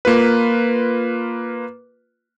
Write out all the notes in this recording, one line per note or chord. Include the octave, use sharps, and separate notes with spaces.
A#3 F4 B4